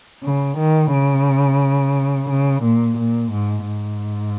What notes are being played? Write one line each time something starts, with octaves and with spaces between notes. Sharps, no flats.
C#3
D#3
C#3
C#3
A#2
A#2
G#2
G#2